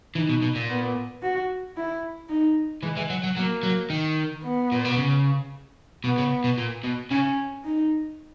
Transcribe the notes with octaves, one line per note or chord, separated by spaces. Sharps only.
E3 D#4
B2
B2
A#2
B3
F#4
E4
D#4
E3 G#3
E3
F#3
F#3
F#3 A#3
F#3
D#3
B3
A#2
B2
C#3
B2 B3
C#3
B2
A#2
B2
C#3 C#4
D#4